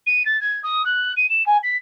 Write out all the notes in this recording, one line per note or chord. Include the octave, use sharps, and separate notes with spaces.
D#7
A6
G#6
D#6
F#6
D#7
E7
G#5
B6